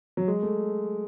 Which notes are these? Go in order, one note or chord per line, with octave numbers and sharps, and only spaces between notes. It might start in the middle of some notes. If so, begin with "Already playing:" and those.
F#3
G#3
A3